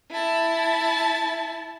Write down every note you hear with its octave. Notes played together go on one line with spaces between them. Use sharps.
E4 A5